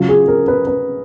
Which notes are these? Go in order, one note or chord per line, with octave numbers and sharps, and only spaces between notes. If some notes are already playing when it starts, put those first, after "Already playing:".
Already playing: C#3 F#3 F4
G#4
A#4
B4
B4